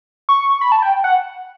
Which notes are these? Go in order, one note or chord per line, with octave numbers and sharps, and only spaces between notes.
C#6
B5
A5
G5
F#5